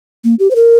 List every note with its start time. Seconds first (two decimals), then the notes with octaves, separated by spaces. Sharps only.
0.24 A#3
0.39 G4
0.51 C5
0.55 A#4